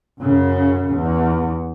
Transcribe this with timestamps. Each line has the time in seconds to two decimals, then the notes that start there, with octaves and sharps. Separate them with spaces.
0.21 F#2 C#3
0.94 E2